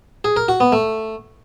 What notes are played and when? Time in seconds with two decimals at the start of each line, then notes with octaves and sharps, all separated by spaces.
0.24 G#4
0.36 A#4
0.48 F#4
0.60 B3
0.72 A3